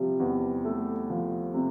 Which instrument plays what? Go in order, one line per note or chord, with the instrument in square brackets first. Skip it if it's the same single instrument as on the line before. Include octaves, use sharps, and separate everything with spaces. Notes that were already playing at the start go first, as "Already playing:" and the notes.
Already playing: [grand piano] C3 F3 [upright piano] G3
[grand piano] E2
A3
F3
C3